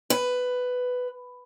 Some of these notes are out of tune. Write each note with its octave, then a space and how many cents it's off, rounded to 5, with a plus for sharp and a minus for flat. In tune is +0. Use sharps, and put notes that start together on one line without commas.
B4 +10